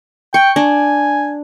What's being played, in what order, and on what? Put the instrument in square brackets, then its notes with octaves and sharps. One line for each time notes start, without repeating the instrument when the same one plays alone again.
[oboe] G5 [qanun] C#6
[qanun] D4 [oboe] G#5